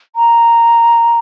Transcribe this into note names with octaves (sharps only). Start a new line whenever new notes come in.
A#5